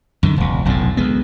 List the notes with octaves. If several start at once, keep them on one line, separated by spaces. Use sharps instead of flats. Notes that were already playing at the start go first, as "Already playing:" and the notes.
F#2 D3 D#3
E1 C#2
F1 B1 E2 A2
D2 G#3 B3